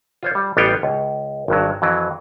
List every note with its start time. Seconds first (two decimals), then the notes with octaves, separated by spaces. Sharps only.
0.23 F4 C5 C#5
0.35 G3
0.57 A1 G3 B3 F4 C#5 G5
0.83 C#2
1.48 G#1 G2 F#3
1.82 F2 E3 F#3